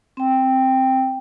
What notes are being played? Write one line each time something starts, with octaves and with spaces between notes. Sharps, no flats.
C4 G5